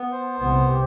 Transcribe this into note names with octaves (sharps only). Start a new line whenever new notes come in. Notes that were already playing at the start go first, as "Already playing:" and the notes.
Already playing: B3
C5
C2 C3 B3
G4